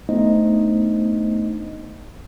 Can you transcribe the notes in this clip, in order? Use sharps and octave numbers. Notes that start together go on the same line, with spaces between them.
A3 B3 D4 D#4 C5 D#5